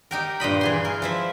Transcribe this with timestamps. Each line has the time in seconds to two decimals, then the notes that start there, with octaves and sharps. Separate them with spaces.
0.11 D#4 G4 A#4
0.40 G2 A#2 D#5 B5
0.61 E3 G#4 C6
0.85 A#4
1.02 F3 E4 E5